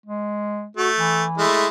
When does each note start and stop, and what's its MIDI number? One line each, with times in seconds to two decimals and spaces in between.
0.06 0.67 56
0.77 1.23 57
0.77 0.90 66
0.98 1.43 52
1.38 1.68 56
1.38 1.68 57
1.38 1.68 64